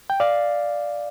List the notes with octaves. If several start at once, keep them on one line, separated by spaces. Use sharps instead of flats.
G5
D5 F5